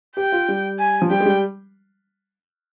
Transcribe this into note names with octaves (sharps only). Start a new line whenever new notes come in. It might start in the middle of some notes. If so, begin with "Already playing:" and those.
G4 G5
F4
G3
G#5
F3
G3 G5
G#3
G3